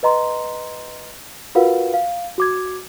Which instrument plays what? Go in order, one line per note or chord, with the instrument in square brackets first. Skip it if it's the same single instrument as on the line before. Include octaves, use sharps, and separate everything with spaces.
[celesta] B4 D#5 A#5 C6
F4 F#4 A#4 B4 F5 F#5
F5
F#4 D6 G#6